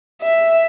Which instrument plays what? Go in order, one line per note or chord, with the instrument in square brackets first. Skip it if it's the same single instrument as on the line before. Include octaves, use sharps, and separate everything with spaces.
[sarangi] E5